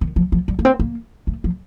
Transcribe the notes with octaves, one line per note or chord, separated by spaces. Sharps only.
D#3
F3
F3
G3
A#3
C4
A#3
A3
F3